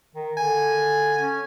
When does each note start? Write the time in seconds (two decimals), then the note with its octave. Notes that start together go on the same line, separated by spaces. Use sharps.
0.15 D#3
0.37 D3 G#5
1.19 C#4